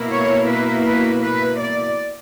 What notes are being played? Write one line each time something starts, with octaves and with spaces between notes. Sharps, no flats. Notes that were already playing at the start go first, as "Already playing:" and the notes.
Already playing: B2 A#3 E4
C#5
B4
B4
B4
D5